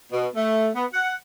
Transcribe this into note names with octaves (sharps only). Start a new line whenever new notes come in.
B2
A3
B3
F#5